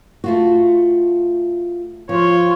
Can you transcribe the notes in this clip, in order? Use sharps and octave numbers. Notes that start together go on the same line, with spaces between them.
A3 F4 F#4
F3 F4 C#5